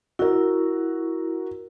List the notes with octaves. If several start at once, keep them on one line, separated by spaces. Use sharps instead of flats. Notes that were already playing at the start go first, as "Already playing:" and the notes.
E4 F#4 A#4